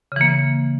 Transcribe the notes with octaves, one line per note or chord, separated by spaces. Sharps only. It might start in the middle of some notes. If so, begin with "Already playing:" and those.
C#3 E3 A#3